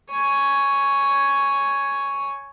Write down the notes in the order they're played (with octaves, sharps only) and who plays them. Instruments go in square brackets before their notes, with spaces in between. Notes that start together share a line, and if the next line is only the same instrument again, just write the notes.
[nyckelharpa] C#5 G#5